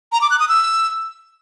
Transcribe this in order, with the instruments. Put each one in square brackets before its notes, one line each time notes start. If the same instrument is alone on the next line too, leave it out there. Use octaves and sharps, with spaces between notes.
[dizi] A#5
D6
F#6
D#6
E6